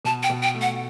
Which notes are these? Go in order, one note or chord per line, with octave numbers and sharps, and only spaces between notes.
B2 A5
G5
B2
G5
A3
F#5